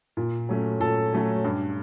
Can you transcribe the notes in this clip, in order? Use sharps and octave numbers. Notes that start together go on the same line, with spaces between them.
A#2
F#3 A3 C#4
A#2 A4
F#3 A3 C#4
G2